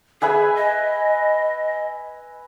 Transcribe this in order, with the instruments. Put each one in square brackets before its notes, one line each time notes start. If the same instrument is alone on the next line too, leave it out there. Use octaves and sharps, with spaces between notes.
[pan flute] G#4 [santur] B4 E5 G#5
[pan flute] D#5